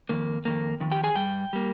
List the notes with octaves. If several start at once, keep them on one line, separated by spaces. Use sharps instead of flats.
F2 D#3 A#3
F2 D#3 A#3
F2 D#3
G4 G5
G#4 G#5
G2 G3 G5
G3 A#3